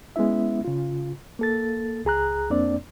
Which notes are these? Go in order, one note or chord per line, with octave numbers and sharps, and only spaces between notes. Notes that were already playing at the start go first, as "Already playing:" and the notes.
G#3 B3 C#4 E4 E5
C#3 F4
A#3 A4 A6
C#2 G#4 A#5 F#6
F2 A#3 C4 D4 D5